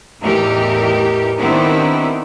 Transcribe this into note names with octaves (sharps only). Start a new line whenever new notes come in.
E2 A2 E3 D#4 G4 A#4
D#3 B3 C4 D4 E4 G4